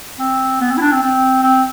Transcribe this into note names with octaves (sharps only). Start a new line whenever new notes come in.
C4
B3
C4
E4
D4
C4
C4
C4